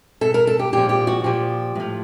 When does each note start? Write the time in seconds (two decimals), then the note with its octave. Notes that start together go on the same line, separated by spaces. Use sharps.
0.21 B2 A4
0.34 A#4
0.47 A4
0.59 G4
0.73 A#2 F3 G4
0.89 G4
1.07 F#4
1.24 A#2 F3 G4
1.75 A2 F3